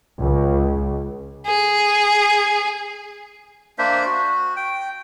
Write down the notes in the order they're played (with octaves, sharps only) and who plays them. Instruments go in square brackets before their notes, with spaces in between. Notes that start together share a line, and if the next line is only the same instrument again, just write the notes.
[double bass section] C#2
[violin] G#4
[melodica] A#3 D4 C5 E5
F#4
G5